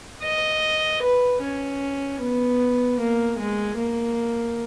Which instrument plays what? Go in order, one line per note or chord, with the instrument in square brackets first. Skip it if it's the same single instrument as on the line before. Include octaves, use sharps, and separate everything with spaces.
[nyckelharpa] D#5
B4
C#4
B3
A#3
G#3
A#3